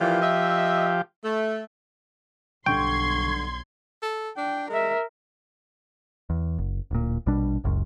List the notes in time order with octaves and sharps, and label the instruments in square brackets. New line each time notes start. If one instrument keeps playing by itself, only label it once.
[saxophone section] A#2 E3 [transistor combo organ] F3 G4
[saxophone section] D#5 E5
A3
[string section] B1 C6 G#6 [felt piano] G2 D3 [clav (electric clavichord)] G5 [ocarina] C#6
[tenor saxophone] A4
[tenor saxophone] D4 [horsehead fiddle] G5
[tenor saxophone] G#3 [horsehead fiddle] A#4 E5
[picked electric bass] E2
F#1
D1 A#2
A#1 B2 G3 D4
F#1 C#2 F#2